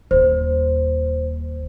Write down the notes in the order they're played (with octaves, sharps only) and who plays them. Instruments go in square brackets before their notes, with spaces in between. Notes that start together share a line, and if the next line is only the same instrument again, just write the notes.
[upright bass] D#1 D#2 [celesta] C5